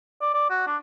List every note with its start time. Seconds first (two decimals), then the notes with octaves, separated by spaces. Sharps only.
0.21 D5
0.34 D5
0.50 F#4
0.67 D4